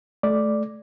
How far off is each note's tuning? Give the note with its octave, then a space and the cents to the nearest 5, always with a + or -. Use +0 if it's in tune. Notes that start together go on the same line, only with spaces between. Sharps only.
A3 -25 D5 +0